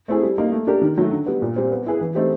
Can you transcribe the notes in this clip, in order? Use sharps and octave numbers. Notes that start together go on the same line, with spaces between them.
A3 C4 E4 G#4
G3
A#3 D#4
A3
D4 G4 A#4
D#3
F#3 A3
D3
G3 B3
A#2
G3 C4
B3
E4 G#4 B4
E3
A3 C4 D#4 G4